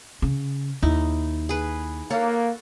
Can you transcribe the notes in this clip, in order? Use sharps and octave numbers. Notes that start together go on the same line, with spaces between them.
C#3
D#2 D#4 E4
G#4 B4
A#3 A4 C#5 F#5